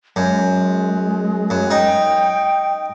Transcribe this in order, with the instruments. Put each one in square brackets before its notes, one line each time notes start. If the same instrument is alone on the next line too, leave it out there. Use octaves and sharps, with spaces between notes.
[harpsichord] F#2 [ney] G#3
[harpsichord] F#2
[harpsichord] D#4 [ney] G5